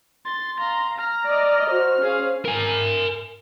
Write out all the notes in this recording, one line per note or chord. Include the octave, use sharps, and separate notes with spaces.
C6 A6
F5 A#5 C6
A#5 F6
D5 D#5
F#4 C5
C#4 G#4 F5
A#4 G#5